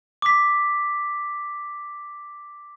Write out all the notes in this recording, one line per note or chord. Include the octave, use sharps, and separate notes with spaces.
D6 B6